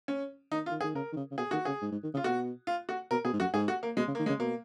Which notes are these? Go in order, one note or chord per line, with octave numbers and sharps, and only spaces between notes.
C#4
D#3 D#4
F4
D#3
G#4
D#3
C#3 A#4
D#3
C#3
C#3
B2 G#4
D#3 F#4
C#3 G#4
G#2
G#2
D#3
C#3
F4
B2 F#4
F4
F#4
B2 A#4
B2 G#4
G#2
F#2 F#4
G#2 G#4
F#4
A#3
B2 G#3
C#3
D#3 A#3
G#3
C#3
B2 A#3